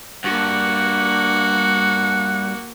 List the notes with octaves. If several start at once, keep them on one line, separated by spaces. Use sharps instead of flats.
G2 A#3 F#4 F#5